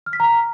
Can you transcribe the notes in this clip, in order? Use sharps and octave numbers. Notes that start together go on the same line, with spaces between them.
F6
B6
A#5